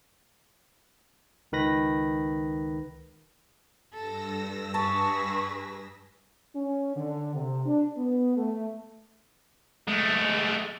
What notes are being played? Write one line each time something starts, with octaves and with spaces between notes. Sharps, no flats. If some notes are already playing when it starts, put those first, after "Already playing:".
C#2 D#3 B4 B5 A#6
G2 A4 E6 A#6
G#4 B4 A5 C#6
C#4
D3
C3
D4
B3
A3
G#3 A3